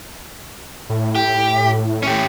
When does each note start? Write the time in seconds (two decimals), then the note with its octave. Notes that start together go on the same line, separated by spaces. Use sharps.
0.90 A2
1.15 G4
2.03 C#4 G4